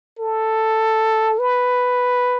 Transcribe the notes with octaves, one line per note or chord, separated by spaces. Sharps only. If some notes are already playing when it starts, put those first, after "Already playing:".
A4
B4